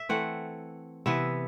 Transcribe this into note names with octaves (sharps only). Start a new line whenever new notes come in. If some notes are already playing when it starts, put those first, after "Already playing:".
Already playing: E5
E3 A3 C4 F#5
C3 E3 B3 E5